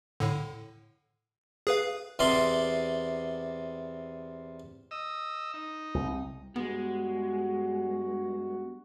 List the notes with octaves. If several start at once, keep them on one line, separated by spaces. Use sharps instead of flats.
A2 D3
G#4 B4 F5
E2 C3 C4 D5 C6
D#5 E6
D#4
C2
G2 G#3 B3 F#4